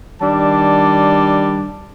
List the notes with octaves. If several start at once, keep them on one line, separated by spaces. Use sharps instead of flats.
D#3 G3 D4 A5